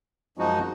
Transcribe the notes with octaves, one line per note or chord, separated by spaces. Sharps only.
F#2 F3 G#3 D#4 F#4